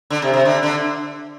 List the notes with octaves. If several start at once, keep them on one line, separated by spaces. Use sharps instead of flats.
D3
C3
C3
D3
D3